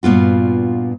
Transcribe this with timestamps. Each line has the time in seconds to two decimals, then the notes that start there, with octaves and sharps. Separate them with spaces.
0.03 G2 A#2 B3 F4 F#4